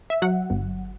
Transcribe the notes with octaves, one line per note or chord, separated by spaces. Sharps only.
E5
F#3 F#5
G1